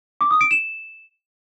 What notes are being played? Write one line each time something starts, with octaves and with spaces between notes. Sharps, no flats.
D6
D#6
D7
E7